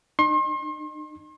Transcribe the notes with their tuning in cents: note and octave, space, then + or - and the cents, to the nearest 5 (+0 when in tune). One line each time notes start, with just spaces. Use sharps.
D#4 -40 C6 +40